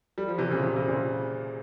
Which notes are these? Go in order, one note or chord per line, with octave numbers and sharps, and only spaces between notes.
G3
F3
C3 E3
A#2 C#3
C3
C3
A#2 C#3